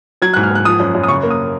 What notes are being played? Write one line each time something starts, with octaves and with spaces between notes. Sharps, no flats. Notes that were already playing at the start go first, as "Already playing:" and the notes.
F#3 G#6
F#6
G#2
F6
G#2 F#6
F3 D#6
F#2
F#2
D#6
C#3 C#6
A#3
D#6